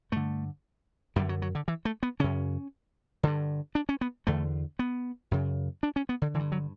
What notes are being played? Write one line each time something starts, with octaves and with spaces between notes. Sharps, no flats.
G2 D3 A3
F#2 D3 G3
F#3
F#3
D3
E3
A3
B3
F#2 C#3 C#4
G2 D3
D4
C#4
B3
E2 D3 A3
B3
F#2 C#3
D4
C#4
B3
D3
G2 D3 E3
F#3